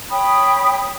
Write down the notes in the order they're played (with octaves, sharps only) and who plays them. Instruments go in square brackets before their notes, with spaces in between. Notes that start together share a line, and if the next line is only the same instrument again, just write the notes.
[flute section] C#5 G5 B5 D#6